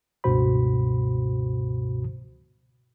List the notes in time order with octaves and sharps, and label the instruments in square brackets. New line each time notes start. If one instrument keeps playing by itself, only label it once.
[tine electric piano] C#2 G2 B2 F#4 C5 B5